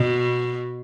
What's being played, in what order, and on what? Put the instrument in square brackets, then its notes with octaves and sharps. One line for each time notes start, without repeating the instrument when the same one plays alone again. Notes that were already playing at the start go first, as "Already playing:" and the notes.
Already playing: [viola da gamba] B2